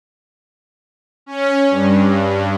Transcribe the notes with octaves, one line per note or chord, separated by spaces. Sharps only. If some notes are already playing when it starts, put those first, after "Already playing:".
C#4
G2